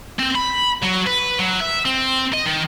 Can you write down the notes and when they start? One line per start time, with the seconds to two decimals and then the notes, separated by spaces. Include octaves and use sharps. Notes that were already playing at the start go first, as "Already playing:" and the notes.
0.19 C4
0.35 B5
0.82 F#3
1.06 B4
1.39 F#3
1.60 E5
1.86 C4
2.34 D#5
2.46 D#3